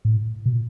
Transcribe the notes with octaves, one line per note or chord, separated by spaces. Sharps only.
A2
B2
A#2